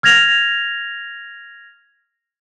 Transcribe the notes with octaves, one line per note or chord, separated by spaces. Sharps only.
F6 G#6 A#6 F7